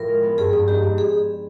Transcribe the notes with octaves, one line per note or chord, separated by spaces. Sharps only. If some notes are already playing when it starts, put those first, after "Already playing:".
Already playing: A2 F3 A#4
G#3
B3
G2 G#4
G2
G#2 G4
G#2
G#4